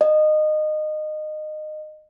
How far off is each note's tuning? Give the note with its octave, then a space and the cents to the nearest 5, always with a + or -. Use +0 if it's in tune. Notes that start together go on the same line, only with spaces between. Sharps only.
D#5 -20